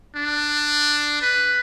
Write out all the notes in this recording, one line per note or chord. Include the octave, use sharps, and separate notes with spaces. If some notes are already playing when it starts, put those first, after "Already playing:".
D4
B4